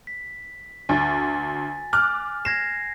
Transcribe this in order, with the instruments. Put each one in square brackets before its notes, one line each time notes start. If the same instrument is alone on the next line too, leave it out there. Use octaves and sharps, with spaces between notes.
[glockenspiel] B6
[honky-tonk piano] D2 [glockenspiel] G#5 A6
[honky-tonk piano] D6 F6 F#6
[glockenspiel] G#6 A#6 C7 [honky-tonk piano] E7